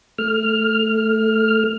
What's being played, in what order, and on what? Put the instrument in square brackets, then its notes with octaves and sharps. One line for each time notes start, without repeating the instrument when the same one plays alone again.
[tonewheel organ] A3 F6